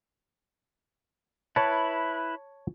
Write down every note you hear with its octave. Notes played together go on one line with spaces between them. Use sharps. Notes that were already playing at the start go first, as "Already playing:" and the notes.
E4 B4 C#5 A5